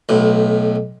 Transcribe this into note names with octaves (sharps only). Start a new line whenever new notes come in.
B1 A2